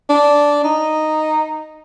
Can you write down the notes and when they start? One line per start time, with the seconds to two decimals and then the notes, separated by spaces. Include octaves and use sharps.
0.09 D4
0.64 D#4